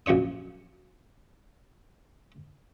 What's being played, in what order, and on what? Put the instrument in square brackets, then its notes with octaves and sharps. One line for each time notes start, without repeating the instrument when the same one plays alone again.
[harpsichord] A#1 F#3 C#4 C#5 D#6